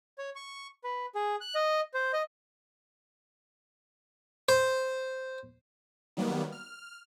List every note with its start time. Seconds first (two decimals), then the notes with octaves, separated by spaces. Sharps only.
0.18 C#5
0.35 C#6
0.84 B4
1.15 G#4
1.41 F#6
1.55 D#5
1.94 C5
2.13 D#5
4.49 C5
6.17 D#3 F#3 G3 A#3 B3
6.52 F6